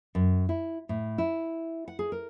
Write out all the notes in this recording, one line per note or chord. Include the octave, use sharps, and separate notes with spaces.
F#2
E4
A2
E4
F#5
G#4
A#4